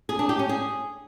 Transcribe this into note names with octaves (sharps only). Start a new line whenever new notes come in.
G#4
D4
G4
C#4
G#4